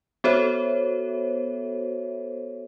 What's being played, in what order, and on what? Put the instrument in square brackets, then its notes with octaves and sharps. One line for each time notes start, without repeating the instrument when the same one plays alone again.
[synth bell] B3 F#4 A4 C5 C#5 E5